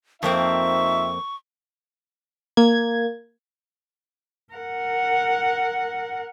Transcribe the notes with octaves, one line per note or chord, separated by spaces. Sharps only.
F2 A#3 C4 D#4 F4 E5 C#6
A#3 G#6
A#4 F#5